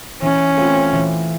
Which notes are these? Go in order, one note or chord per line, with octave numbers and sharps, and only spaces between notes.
E3 C#4
A3 C4 F4
E3